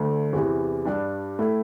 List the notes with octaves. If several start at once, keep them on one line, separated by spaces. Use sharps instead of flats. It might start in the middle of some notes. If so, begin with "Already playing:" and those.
Already playing: D2 D3 A3
E2 C3 E3
G2 G3 D4
A2 A3 E4